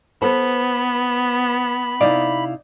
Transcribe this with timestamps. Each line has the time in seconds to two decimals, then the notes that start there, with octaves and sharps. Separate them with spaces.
0.22 B3 A4 B4 C5 B5
2.01 C3 D#4 E4 D5 F5